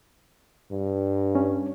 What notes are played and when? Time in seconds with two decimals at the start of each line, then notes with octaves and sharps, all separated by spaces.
0.71 G2
1.35 C#4